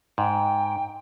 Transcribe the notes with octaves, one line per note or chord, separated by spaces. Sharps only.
G#2 G5